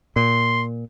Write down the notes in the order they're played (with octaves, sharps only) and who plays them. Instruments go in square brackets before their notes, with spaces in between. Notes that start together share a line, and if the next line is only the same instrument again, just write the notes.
[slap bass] A#2 [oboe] C6